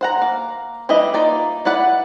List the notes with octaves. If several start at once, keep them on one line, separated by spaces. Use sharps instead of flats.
C5 F#5 A#5
A#3 F5
E3 G3 E4 D#5
A#3 D#4 F4 D5
E4 B4 D5 F#5